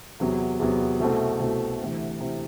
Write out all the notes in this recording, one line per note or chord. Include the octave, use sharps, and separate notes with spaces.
E2 C3 F#3 B3
E2 C3 F#3 B3
C2 B2 A3 C4
C2 B2 A3 C4
D2 C3 E3
C3 E3